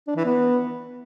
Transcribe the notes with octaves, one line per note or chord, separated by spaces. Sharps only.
D4
E3
B3